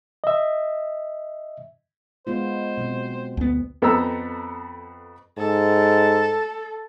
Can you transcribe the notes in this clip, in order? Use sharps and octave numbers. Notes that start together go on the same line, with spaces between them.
D#5 E5
G#3 B3 F4 C5
B2 F#3 C4
D2 B3
F2 B3 C4 A4 A#5 E6
G#2 A4